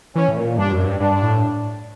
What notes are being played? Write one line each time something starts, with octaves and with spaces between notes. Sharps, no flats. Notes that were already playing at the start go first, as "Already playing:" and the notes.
E3 C#4
A2
A#2
G2 D4
F#2
G2
G2 D4
A2